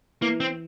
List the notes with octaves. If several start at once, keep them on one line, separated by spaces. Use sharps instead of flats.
E3 A#3
C4